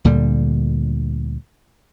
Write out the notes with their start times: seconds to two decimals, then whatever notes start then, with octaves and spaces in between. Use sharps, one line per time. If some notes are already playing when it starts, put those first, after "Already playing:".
0.05 D2 A#2 D3 G3